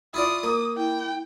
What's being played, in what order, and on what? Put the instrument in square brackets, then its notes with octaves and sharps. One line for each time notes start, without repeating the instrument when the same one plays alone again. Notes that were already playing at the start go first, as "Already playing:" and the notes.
[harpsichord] E4 F4 D5 [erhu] D#6
[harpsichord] A#3
[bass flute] E4 [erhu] G5